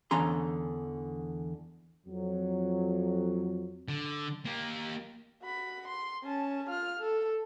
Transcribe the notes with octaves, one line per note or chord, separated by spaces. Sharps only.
E2 D3 E3 C#4 A#5 C6
F2 F#3
D3
A#3 G4
F#4 B5
C6
C#4 A5
F4 F6
A4